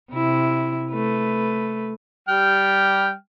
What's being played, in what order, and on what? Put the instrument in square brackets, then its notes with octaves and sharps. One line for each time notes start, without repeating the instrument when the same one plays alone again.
[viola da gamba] C3 E4
A3 B4
[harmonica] G3 G5 F6